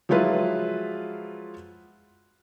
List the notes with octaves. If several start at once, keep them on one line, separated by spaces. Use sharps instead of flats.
F3 F#3 G#3 E4 F4 B4